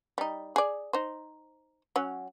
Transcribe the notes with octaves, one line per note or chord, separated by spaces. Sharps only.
G3 D#4
G#4 D5
D#4 C5
F#3 C#4 F#5